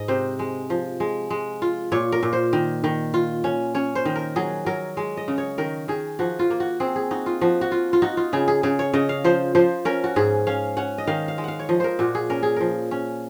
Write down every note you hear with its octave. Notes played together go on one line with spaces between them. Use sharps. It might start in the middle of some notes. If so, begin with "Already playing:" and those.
Already playing: G#2 D#5
C3 C5
G#3
F3
G#3
G#3
F4
A#2 C#5
A#4
A#2
C5
D#3
D#3
F4
C#4
C#4 C#5
C5
D#3
A#4
F#3 G#4
F#3 A#4
G#3
D#5
C#3
C#5
D#3 A#4
D#3 G#4
F3 F#4
F4
A#3
F#4
C4 G#4
G#4
D#4 F#4
F4
F3 F#4
F#4
F4
F4
D#4 F#4
F4
C#3 G#4
G#4
C#3 G#4
C#5
C#3 D#5
F5
F3 C5
F3 C5
C#4 A#4
F#4
G#2 G#4
C#4 F5
C#4 F#5
D#5
D#3 F5
F5
G#3
F5 F#5
C#5
F3 D#5
A#4 C5
A#2 F#4
G#4
C#4 A#4
G#4
F3 A#4
C#4